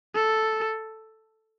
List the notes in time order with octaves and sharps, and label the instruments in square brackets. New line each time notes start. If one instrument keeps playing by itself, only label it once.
[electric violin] A4